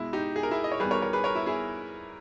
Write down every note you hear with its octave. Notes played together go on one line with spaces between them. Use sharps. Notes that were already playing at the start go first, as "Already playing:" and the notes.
Already playing: B2 G#3 E4
D#4 G4
G#4
A#4
E4 G#4
D#5
C#5
E2 D#3 G3 G#4 B4
A#4 C#5
A#4 C#5
G#4 B4
A#4 C#5
E4
E4 G#4